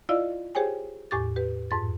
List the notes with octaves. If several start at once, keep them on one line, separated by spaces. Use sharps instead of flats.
E4 F4 D5 D#5 F5 E6
G4 G#4 C5 C#5 G5 G#5
E2 A2 G4 D6 A6
G4 B4
F2 G#2 A6